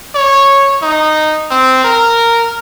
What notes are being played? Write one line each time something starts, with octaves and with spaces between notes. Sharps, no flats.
C#5
D#4
C4
A#4